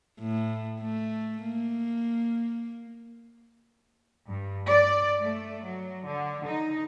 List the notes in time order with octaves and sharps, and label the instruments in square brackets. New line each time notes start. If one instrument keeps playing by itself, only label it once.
[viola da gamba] A2
A3
A#3
[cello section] G2
D5
A3
F#3
D3
D#4